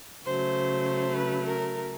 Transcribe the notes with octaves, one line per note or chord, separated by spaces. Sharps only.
C#3 F#3 A3 C5
B4
A#4